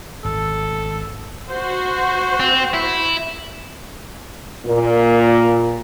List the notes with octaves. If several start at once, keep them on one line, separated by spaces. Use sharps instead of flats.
G#1 A4
F#4 C5
C4
E4
A#2